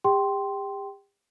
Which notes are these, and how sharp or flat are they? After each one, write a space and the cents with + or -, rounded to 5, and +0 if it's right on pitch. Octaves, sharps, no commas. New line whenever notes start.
G4 +40 G5 -15 C6 +0